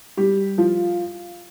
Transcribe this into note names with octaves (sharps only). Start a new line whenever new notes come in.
G3 G4
F3 F4